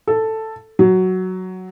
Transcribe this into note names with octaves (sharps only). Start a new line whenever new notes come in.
A4
F#3